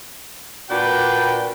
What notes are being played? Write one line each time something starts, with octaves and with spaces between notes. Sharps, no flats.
A#2 D4 F#4 B4 G5